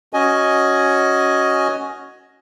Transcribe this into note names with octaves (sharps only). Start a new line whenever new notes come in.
C#4 F#4 D#5 G#5